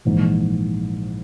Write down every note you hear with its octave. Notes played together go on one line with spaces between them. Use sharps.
A#1 G#2 E3